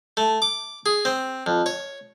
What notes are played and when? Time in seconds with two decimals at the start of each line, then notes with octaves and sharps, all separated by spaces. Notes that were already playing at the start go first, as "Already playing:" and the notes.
0.17 A3
0.42 D6
0.86 G#4
1.05 C4
1.46 F2
1.66 C#5